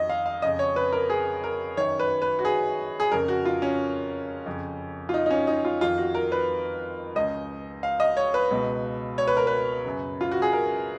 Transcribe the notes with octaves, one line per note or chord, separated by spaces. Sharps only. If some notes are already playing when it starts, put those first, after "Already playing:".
Already playing: F2 D#3 D#5
F5
F5
F2 C#3 D#5
C#5
B4
A#4
G#4
A#4
F#2 D#3 C#5
B4
B4
F#4
G#4
G#4
F2 C#3 A#4
F#4
F4
C#4
F2 C#3
F4
D#4
D#4
C#4
D#4
F4
F2 D#3 F4
F#4
A#4
B4
C#2 C#3 D#5
F5
D#5
C#5
B4
C#2 B2
C#5
B4
A#4
B4
F#2 C#3
F4
F#4
G#4
A#4